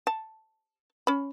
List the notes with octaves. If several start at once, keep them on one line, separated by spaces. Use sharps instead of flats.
A5
C#4 B5